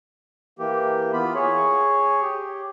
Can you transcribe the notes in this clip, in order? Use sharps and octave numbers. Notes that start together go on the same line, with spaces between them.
E3 A#3 G4
E3 B3 F4 B5
G#4 C#5
G4